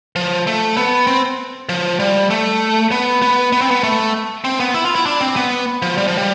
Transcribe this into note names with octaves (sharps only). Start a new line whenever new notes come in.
F3
A3
B3
C4
F3
G3
A3
B3
B3
B3
C4
B3
A3
C4
B3
E4
F4
E4
D4
C4
B3
F3
G3
F3
G3